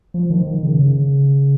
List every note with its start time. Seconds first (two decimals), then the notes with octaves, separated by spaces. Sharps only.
0.14 F3
0.30 D#3
0.47 D#3
0.63 C#3
0.79 C#3